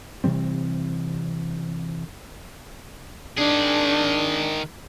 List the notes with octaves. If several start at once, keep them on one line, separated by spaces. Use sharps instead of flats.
C3 E3 G3 C4
D#3 D4 G#4